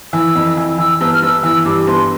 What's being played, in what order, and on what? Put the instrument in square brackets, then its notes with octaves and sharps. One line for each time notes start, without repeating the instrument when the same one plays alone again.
[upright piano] E3 [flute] E6
[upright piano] F2
E3
[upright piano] E3 [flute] E6
[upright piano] G1 [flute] E6
[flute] F6
[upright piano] G1 [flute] E6
[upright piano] E3 [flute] E6
[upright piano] G2 [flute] D6
[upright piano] G1 [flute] C6